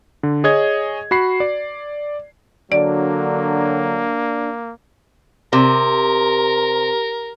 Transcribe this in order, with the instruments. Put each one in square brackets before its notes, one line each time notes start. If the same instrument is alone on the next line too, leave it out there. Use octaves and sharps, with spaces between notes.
[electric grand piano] D3
G#4 C#5 D#5 G#6
F#4 B5 C7
D5
[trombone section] D3 F#3 [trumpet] A#3 [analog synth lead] D4 [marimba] D5
[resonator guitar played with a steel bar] C3 [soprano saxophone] A#4